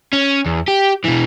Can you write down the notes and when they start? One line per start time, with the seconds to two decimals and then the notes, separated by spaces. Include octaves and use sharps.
0.13 C#4
0.46 E2
0.68 G4
1.04 B2 E3